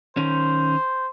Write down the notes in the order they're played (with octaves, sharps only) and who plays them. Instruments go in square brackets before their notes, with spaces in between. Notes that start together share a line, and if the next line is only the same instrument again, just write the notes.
[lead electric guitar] D#3 C#4 [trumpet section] C5